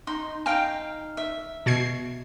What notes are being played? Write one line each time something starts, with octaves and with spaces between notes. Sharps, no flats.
D#4 C6
D#4 F5 G5
E5
B2 G#6 C7